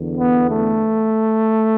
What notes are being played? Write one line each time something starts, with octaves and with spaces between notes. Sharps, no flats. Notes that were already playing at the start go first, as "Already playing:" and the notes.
Already playing: E2 D3
B3
A3